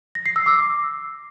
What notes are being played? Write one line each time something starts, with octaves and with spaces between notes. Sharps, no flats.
A#6
C7
E6
D6